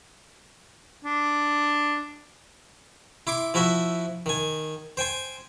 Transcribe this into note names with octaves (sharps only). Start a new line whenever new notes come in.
D4
E4 C6 D6
F3 E4 F#4 E5
D#3 G#5
C5 G5 G#5 C6